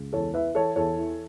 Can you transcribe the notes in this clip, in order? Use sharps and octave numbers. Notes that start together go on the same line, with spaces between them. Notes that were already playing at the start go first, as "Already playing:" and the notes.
Already playing: C#2
E2 A4 C#5
E3 B4 E5
E3 A4 C#5
E2 A4 C#5
E3